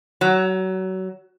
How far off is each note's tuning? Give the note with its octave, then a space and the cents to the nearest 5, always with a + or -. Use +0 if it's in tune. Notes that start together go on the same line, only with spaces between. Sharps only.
F#3 +25